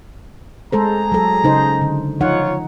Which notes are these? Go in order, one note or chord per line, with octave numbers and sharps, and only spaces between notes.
G#3 G#4 A4 C5 A#5
F#3 A4
C#3 D#4 C5
D3
F3 D#4 F4 C#5 F#5